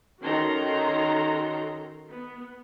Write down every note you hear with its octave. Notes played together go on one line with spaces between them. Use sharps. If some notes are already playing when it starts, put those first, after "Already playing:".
D#3 C#4 F#4 A4 A#5 C6
B3